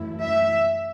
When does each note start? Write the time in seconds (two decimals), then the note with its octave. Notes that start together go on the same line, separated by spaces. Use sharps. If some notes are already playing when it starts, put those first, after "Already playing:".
Already playing: F#2 E3 A3 E4
0.23 E5